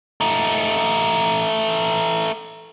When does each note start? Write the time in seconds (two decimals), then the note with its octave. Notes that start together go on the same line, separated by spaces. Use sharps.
0.21 A3 D#4